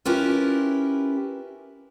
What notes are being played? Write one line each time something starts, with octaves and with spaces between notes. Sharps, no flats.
C#4 E4 F4 G4 A#4 B4